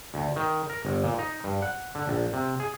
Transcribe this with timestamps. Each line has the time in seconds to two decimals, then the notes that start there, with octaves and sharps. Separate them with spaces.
0.14 D2
0.36 D#3
0.70 A#4
0.85 G1
1.04 A#2
1.19 D#4
1.44 G2
1.62 F#5
1.95 D3
2.08 A#1
2.33 C3
2.60 G#4